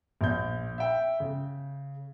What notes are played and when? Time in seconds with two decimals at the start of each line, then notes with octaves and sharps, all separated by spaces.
0.21 A#1 G6
0.78 E5 G5
1.20 C#3